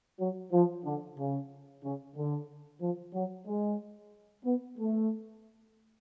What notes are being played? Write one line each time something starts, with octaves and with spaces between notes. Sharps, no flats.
F#3
F3
D3
C#3
C#3
D3
F3
F#3
G#3
B3
A3